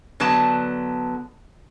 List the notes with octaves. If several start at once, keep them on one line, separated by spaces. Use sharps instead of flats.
D3 F#3 B3 A5